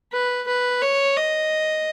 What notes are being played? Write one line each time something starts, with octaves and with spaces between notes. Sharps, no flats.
B4
B4
C#5
D#5